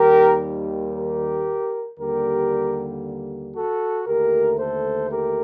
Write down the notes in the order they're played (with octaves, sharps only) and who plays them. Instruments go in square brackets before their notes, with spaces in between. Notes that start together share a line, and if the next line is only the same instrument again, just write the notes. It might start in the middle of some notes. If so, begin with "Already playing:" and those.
Already playing: [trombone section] D#2 D#3 G3 G4 A#4
G4 A#4
D#2 D3 G3 A#3 G4 A#4
F#4 A4
D#2 D3 A3 G4 A#4
A4 C5
G4 A#4